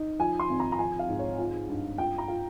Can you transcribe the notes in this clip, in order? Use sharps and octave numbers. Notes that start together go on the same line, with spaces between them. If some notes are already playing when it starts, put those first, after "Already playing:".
Already playing: D#4
F3 G#5
C6
G#1
A#5
A#5
F3 G#5
F5
G#2
C#5
F4
G2
F4 G5
A#5
F4